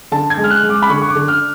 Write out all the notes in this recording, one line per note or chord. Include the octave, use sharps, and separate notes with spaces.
D3 A5
G#6
G#3
F6
F#6
G#3
D6
B5
D3 C#6
C#6
D6
D3
F6